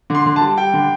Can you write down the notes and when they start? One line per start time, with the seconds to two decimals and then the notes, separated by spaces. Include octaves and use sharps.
0.10 D3 C6
0.26 D3
0.36 A5
0.41 G3
0.57 G3 G5
0.74 D3